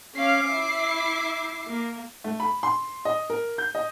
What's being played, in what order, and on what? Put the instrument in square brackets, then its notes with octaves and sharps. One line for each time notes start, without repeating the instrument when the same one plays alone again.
[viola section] C#4 F5 [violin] D6 C7
[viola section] E4 E5
A#3
[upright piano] A3
B5
C6
D#5
A#4
G6
D#5